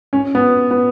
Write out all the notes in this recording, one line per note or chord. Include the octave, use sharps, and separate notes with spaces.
C#4
B3
B3